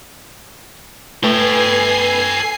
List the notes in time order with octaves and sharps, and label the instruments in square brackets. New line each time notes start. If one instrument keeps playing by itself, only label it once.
[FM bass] A3 [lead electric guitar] A4 G5 [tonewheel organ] B4 [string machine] G#5 C7